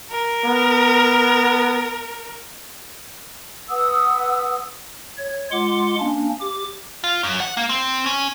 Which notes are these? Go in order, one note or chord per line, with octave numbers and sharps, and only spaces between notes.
A#4
B3
B4 F#5 D#6 E6
C#5
G#3 F4 F#5 C6 D6
A#3 C#4 D4
G4 D6
F4
F#2
F#5
A#3
C4
C#4